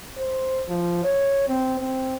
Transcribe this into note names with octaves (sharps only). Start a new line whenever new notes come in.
C5
F3
C#5
C4
C4